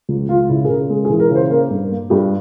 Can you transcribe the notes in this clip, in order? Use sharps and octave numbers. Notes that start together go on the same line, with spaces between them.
C#2
C#2 F4
C#3 E4
G#4
C#3 A#4
G#3
G#4
E3
A#4
C#3
C5
A#3 A#4
G2
A#3
G2 G4